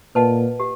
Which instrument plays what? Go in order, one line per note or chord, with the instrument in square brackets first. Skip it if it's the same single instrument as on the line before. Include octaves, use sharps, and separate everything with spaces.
[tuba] A#2 [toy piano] B4 D#5 F#5 A5
[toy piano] G4